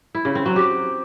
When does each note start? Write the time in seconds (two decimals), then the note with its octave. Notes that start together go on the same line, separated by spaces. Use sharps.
0.15 E4
0.25 C#3
0.35 C4
0.46 F#3
0.56 G4